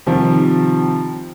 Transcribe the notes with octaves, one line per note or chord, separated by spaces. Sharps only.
C3 D#3 F3 G3